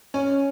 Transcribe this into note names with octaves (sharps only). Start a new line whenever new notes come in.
C#4 C#5